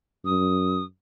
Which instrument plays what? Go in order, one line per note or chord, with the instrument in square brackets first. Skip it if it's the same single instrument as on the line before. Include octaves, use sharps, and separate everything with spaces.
[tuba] F#2 [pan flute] D#6